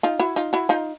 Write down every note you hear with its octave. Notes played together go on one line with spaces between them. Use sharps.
D#4 F4
E4 F#4
D#4 F4
E4 F#4
D#4 F4